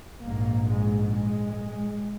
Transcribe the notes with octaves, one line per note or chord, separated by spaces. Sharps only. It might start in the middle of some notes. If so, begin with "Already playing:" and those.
A#1 G#2 A#3
G#3
G#3